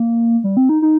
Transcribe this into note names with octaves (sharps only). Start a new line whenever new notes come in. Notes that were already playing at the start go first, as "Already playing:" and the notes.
Already playing: A#3
G3
C4
D#4
D#4